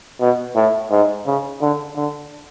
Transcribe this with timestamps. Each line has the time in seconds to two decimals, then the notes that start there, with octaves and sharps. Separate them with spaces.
0.20 B2
0.56 A2
0.91 G#2
1.27 C#3
1.61 D3
1.96 D3